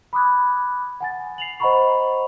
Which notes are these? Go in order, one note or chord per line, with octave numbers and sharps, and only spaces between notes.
B5 D6 D#6 F#6 G#6
F#5 G#5 A6
C7 F7 F#7
C5 D#5 F#5 A#5 B5 C#6